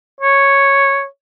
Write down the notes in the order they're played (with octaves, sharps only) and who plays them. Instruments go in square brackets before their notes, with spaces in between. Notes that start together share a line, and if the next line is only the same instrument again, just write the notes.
[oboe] C#5